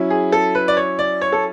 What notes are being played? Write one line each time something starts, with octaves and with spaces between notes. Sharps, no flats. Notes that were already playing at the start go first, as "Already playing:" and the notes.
Already playing: F#3 C#4 E4
G#4
A4
B4
D5
C#5
D5
C#5
A4